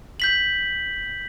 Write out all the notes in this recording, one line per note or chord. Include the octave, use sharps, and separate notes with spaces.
G6 B6 F#7